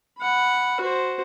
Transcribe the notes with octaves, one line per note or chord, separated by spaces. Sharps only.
F#5 B5
F#4 C5